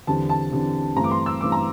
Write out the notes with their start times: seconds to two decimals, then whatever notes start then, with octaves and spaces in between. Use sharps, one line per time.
0.07 E2 D3 G3 C4 A5
0.29 A5
0.52 E2 D3 G3 C4
0.96 G2 E3 A3 C4 A#5
1.04 D6
1.11 C6
1.26 E6
1.41 G2 E3 A3 C4 D6
1.52 A#5